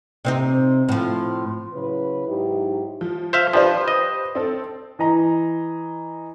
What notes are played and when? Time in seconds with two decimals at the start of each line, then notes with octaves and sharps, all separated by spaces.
0.25 C3 C4 D#4
0.89 A2 F3
1.73 C#3 F#3 E4 B4
2.26 G#2 F#3 D#4 E4 G4
3.01 F3
3.33 C5 E5 F5
3.53 F3 G4 B4 C5
3.88 D#5
4.35 C4 A4
4.99 E3 D#5 A#5